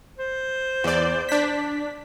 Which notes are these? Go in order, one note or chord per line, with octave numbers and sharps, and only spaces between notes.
C5
E2 D5
D4 B6